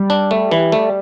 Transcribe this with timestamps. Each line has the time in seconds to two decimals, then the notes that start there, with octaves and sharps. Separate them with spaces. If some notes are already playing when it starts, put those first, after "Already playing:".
Already playing: G3
0.10 D4
0.31 A3
0.51 E3
0.72 A3